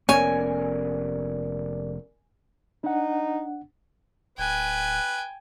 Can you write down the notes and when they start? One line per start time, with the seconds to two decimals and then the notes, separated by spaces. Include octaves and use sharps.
0.09 F1 B3 C#4 A#4 C#5 D5 G#5
2.84 D4 D#4 F#5
4.38 D1 B4 G5 G#5